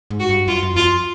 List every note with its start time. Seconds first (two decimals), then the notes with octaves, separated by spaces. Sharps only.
0.10 G#2
0.20 F#4
0.29 G2
0.47 F#2 F4
0.63 F#2
0.76 F2 F4